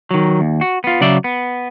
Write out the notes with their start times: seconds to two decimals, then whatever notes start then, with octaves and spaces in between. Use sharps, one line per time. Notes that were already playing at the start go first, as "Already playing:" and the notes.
0.11 D#3 F#3
0.41 D#2
0.61 F#4
0.84 B3 F4
1.01 C#3 F#3 D5 E5
1.24 B3